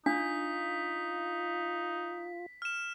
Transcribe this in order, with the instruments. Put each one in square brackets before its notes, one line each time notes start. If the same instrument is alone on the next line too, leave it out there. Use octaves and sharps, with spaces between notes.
[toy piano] D4 [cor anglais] D#4 [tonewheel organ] F4 [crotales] B6
[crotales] F6 E7